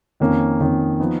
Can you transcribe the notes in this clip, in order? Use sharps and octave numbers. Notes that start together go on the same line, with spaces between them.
F2 D#3 A#3 C#4
F2 D#3 A#3 C#4
F3 B3 D#4